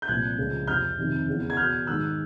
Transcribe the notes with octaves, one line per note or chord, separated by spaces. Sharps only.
G6
C2 A#2 F3 F#6 G#6
C#2 C#3 F3
F2 C3 F3 F6 G6
F2 C3 D#3
E2 C#3 E3
G#6
E2 B2 F6 G6
G#2 D#3 E6 F#6